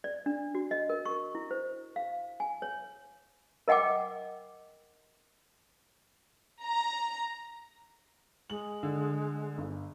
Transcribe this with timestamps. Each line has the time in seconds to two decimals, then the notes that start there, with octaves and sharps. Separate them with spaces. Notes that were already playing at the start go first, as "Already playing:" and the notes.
0.04 D5
0.26 D4
0.55 F#4
0.71 D#5
0.89 A#4
1.05 C#6
1.35 E4
1.51 C5
1.96 F5
2.40 G#5
2.62 C#5
3.68 A#4 D#5 F#5 G5 D6
6.64 A#5
8.50 G#3 F#7
8.83 D3
9.58 G1